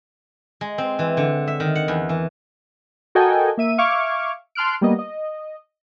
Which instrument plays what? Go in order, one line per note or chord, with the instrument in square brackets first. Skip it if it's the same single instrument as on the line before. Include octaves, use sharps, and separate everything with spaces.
[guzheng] G#3
C4
E3
D3
E5
D#3
F#5
E2
E3
[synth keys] F#4 A4 A#4 D#5 G5 G#5
A#3 E5 D#7
E5 F5 C#6 D6 F6 G#6
A5 C6 F6 F#6 D7
G3 A#3 B3 D#5
D#5